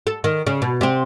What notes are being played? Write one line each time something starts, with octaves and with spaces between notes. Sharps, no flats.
A4
D#3
C#3
B2
C3 C4